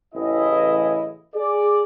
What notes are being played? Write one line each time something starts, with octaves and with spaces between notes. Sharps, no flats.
A1 C#3 E4 D#5
G#4 D5